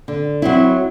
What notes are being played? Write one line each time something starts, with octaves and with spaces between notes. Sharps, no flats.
D3
F#3 C4 E4